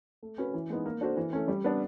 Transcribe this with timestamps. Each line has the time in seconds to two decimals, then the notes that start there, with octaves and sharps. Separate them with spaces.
0.23 A3
0.38 C#4 F#4 B4
0.54 E3
0.70 G#3 B3 D#4
0.86 A#3
1.01 D4 F#4 A4 C5
1.17 E3
1.33 A3 C#4
1.48 G3
1.64 B3 D4